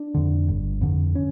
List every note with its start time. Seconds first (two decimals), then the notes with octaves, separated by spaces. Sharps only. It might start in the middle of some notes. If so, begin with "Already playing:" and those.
Already playing: D4
0.15 F2 D3
0.48 G1
0.81 F2 D3
1.15 C#4